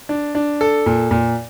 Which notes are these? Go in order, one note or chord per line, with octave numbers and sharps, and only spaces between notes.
D4
D4
A4
A#2
A#2